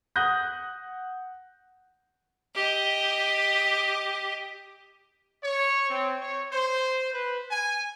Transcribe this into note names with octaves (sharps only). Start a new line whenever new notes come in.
F#5 D#6 F#6 G6 A#6
G4 D#5
C#5
C4
C#5
C5
B4
G#5